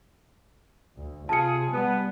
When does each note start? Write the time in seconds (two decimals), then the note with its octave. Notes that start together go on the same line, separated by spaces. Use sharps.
0.97 D2
1.29 C3 F4 G#4 A5 C#7
1.72 G3 B3